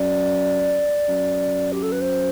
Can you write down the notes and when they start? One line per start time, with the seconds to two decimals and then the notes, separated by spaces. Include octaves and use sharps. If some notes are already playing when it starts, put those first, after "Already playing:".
Already playing: F#2 D5
1.09 F#2
1.72 G4
1.83 A4
1.92 B4
2.01 C5